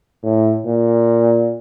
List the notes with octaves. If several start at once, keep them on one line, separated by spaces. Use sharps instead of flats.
A2
A#2